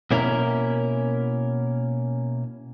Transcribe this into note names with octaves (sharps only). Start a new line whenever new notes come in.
B2 A#3 C#4 E4 A4 A#4